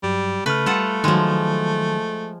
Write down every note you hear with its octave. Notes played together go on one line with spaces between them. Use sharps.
G2 F#3 G3
C#3 A3 B4 F6
G3 F4 A4 F#5
D#3 F3 F#3 G#3